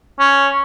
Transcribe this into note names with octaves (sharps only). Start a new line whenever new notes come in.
C#4